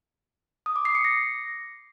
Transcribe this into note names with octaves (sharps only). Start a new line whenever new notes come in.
D#6
D6
C7
C#7
A#6